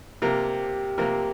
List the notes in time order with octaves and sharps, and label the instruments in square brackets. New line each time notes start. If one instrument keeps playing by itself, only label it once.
[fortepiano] C3 F3 A#3 F4 A#4 [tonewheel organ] G4
[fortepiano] C3 F3 A#3 F4 A#4